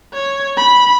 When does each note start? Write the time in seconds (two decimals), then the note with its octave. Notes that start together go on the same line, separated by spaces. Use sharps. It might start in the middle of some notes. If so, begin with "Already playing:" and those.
0.14 C#5
0.57 B5